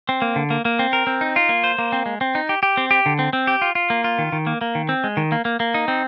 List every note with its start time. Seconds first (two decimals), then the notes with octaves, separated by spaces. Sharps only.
0.09 C4
0.22 A#3
0.36 D3
0.50 A#3
0.65 A#3
0.79 C4
0.93 A#4
1.07 C4
1.21 D#4
1.36 F4
1.49 A#3
1.64 C5
1.79 A#3
1.92 C4
2.06 G#3
2.21 C4
2.35 D#4
2.49 G4
2.63 G4
2.77 C4
2.91 G4
3.06 D3
3.19 C4
3.33 C4
3.47 G4
3.62 F4
3.75 F4
3.90 A#3
4.04 F4
4.18 D#3
4.32 D#3
4.47 A#3
4.61 A#3
4.75 D#3
4.89 C4
5.04 G#3
5.17 D#3
5.32 A#3
5.45 A#3
5.60 A#3
5.74 D#4
5.88 C4